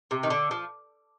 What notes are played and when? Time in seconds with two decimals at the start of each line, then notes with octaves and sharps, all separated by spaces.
0.11 C3
0.23 D#3
0.30 D3
0.51 F3